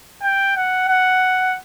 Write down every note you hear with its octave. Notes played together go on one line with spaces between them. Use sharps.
G5
F#5
F#5